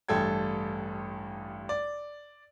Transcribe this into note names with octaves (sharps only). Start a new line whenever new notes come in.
A1 G2 A4 G5 G#6
D5